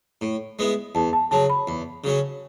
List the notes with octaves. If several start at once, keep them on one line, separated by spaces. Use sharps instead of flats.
A2
G#3 B3 E4
E2 A5
A5
C#3 F#3 A5
B5
E2
C#3 F#3 C#4